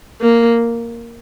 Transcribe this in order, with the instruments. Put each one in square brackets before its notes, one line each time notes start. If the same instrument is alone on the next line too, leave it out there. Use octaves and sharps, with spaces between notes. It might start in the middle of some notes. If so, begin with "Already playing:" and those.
[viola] A#3